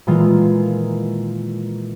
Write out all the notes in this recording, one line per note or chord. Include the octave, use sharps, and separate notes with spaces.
A#2 D#3 E3 G#3 F4